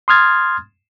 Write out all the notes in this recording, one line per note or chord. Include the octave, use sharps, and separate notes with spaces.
C6 D#6 F6 G#6 A6